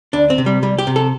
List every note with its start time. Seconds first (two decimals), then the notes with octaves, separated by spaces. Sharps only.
0.13 D2 D4
0.30 C4
0.38 C3
0.46 G3
0.63 C2 G3
0.78 G4
0.87 C3
0.96 A4